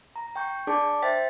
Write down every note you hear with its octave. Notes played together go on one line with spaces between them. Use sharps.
A#5
G5 C#6 G6
D4 G#4 D5 A5 D6
C5 E5 G5 A6 B6